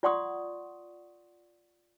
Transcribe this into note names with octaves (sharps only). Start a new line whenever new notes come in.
F4 D5 F#5 C6 C#6 D#6